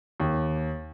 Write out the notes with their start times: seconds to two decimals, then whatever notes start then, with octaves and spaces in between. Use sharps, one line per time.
0.20 D#2